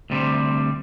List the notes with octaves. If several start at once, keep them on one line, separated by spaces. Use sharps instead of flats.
D2 C3 G3 C4